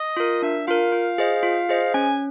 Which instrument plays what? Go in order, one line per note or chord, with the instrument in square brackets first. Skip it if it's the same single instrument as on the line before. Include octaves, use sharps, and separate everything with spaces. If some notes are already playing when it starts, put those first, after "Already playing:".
Already playing: [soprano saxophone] D#5
[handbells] F4 A#4
[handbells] D4 [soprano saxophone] E5
[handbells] F4 A#4 [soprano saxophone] F5
[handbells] F4
G#4 C5 D#5
F4
G#4 C5 D#5
[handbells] C#4 [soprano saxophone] G#5